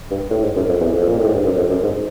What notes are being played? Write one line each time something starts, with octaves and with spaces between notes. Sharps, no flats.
G2
A2
G#2
F#2
F2
E2
F2
A#2
A2
G#2
G2
F#2
F2
F#2
G#2